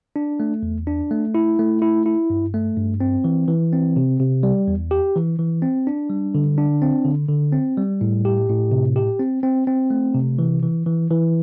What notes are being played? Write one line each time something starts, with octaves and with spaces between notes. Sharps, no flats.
D4
A3
E2
D4
A3
E4
A3
E4
E4
G2
A3
G2
C4
E3
E3
C4
C3
C3
G3
E2
G4
E3
E3
C4
D4
G3
D3
D4
C4
D3
D3
C4
G3
A2
G4
A2
C3
G4
C4
C4
C4
A3
C3
E3
E3
E3
E3